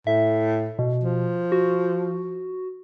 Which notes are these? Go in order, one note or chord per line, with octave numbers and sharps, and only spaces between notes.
A2 E5
B2
F3
F#4